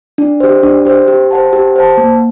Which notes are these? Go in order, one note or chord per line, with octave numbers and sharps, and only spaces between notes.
D4
G4 C5
D4
G4 C5
G4
C5 F#5 A5
G4
C5 F#5 A5
A#3